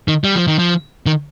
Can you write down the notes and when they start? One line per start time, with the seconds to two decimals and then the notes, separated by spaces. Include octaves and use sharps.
0.08 D#3
0.24 G3
0.36 F3
0.47 D#3
0.59 F3
1.06 D#3